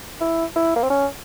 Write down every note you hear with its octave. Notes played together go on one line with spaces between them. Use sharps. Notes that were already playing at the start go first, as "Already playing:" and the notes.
E4
E4
A#3
C4
C#4